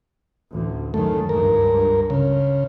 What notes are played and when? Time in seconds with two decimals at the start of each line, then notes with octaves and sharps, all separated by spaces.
0.52 A1 D2
0.94 F#2 D#3 A3
1.29 C#2 G2 A#4
2.10 C#3